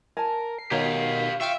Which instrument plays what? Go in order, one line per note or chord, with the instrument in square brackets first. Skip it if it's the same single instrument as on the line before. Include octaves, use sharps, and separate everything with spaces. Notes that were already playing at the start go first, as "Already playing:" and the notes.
[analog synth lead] A#4 [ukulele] G#5 A5
[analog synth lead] C7
[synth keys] B2 D#3 [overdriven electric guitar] G4 F5 [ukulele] C#5 A#5
[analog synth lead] F4 [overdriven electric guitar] E5 [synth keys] F5 G5 C#6